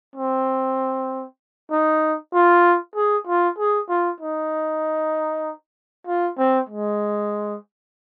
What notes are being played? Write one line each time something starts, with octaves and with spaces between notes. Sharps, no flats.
C4
D#4
F4
G#4
F4
G#4
F4
D#4
F4
C4
G#3